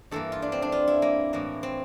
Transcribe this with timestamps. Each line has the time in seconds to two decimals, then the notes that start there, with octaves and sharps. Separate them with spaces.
0.11 G2 E3 A#3 A4
0.32 F4
0.42 D4
0.52 C4
0.62 D4
0.72 F4
0.88 E4
1.02 A#3
1.33 A2 E3 A#3
1.63 C4